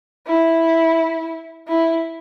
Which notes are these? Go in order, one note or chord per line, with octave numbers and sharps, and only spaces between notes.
E4
E4